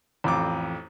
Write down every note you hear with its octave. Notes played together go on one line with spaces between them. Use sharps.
A1 F2 D6